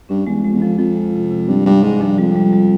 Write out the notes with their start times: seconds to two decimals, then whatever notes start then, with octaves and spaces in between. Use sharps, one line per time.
0.09 G2 C#4
0.26 E2 G#3
0.43 F2 G#3
0.54 E2
0.61 F2 F3
0.78 F2 F3
0.96 G#3
1.13 C3
1.31 C3
1.48 G2 C#4
1.65 G2 F3
1.83 G#2 C#4
2.01 G2 F3
2.18 F2 G3
2.35 G3
2.53 G3